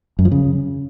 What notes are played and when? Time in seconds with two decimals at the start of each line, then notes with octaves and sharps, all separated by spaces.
0.19 F#2
0.25 F3
0.32 C#3